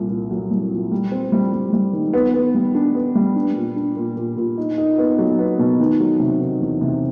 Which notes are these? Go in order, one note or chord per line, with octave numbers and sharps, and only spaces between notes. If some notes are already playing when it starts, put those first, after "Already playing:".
Already playing: C2 A#2
A#2
F#3
C2
A#2
G3
C4
G3
G3
G3
D#3
B3
B3
G3
D4
B3
G3
D4
A#2
D4
A#2
A#2
A#2
D#4
D#4
B3
F#3
B3
B2
D#3
F#3
C3
D#3
E2
C3